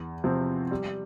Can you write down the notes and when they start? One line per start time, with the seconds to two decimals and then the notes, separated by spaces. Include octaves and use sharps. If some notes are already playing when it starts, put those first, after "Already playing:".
Already playing: E2
0.24 C3 F3 C4
0.71 G3